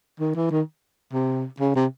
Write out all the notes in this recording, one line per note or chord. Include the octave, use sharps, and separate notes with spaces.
D#3
E3
D#3
C3
C#3
C3